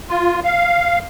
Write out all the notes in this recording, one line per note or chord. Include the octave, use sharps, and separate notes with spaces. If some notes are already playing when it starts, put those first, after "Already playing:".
F4
F5